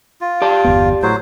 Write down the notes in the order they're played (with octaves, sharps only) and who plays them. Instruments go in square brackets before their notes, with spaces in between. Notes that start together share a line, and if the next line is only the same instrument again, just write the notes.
[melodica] F4
[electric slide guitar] G4 D5 A5
[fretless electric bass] G1 E2 B3
[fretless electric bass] A2 [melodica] F#3 C5